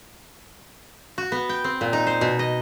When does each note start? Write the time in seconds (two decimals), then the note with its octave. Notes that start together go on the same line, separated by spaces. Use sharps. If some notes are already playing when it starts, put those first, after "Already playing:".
1.18 F#4
1.32 B3
1.49 G5
1.64 C4
1.81 A#2
1.93 D#4
2.07 C5
2.21 B2
2.39 D#5